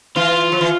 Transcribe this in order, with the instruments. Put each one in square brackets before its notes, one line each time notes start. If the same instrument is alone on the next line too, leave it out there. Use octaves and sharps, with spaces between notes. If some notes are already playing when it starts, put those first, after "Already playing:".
[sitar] E3 [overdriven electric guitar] F4
[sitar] F3
E3